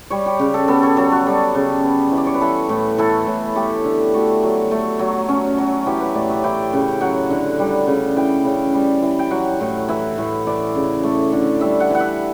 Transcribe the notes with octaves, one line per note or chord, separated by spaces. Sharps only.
G3 C#5
G4
C#3
A4
B3 A4
C#5
F#3 A4
F#4
G3 G4
C#3
B3
E3
D5
C#5
B4
E3 A4
A2
E3 A4
A2
A3 G4
D3
A3 F#4
F#3
A3
F#3
C#4
F#3
E3 G4
B4
A2 D5
E5
E3 G5
C#3
F#3 F#5
D3
G3
C#3
E3 G5
C#3
G3
E3
G5
F#3 F#5
A2
E3 E5
A2
E3 D5
C#3
A3
D3
G3 E5
F#5
E3 F#5
E5